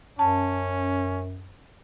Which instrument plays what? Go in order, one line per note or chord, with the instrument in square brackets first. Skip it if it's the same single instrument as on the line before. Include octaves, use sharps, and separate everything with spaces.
[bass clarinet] F#2 [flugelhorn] C#4 [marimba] A5